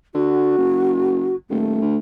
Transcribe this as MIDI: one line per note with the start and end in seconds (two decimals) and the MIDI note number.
0.14 0.53 50
0.14 1.35 66
0.58 1.32 30
1.50 1.78 27
1.50 1.98 57
1.82 1.97 38